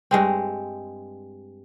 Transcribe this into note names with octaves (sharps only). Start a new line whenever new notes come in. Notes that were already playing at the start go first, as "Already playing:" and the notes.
G2 G#3 C4